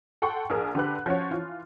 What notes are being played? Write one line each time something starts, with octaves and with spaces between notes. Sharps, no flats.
A4 F#5 G5 C6 C#6
A#1 G#4 A#4
D3 G4 B4 F#6
F3 C#4 F#4 C#5
E3 F4